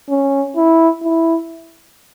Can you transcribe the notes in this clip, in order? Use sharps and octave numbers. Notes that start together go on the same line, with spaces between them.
C#4
E4
E4